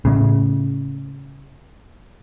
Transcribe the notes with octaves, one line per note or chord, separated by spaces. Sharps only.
A2 C#3